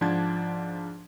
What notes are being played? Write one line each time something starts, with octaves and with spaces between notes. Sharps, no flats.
G#2 F3 D4 F#5 A5 G#6